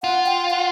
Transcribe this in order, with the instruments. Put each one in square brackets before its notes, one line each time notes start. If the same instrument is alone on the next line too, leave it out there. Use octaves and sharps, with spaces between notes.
[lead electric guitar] F4 [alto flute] F#5
[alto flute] G5
F#5